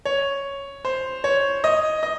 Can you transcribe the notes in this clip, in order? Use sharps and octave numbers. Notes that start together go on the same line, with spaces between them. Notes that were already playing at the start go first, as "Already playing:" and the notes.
C#5
C5
C#5
D#5
D#5